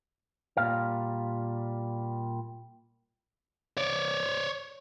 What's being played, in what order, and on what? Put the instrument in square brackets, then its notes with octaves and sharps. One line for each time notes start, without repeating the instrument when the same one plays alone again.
[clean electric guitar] A#2 G3 F5
[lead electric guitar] C#5 D5